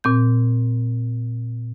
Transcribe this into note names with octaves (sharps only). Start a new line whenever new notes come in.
A#2 C4 G6